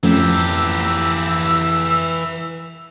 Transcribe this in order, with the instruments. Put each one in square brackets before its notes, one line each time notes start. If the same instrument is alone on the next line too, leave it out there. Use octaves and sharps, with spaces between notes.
[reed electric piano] F2 [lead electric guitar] E3 G4 [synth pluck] F3 A3 C#4 [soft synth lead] E6